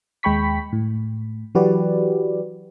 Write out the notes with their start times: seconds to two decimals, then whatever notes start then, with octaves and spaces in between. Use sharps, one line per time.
0.23 D#2 G#3 G5 B5 C#6 B6
0.73 A2
1.55 E3 F#3 F#4 G4 B4 D5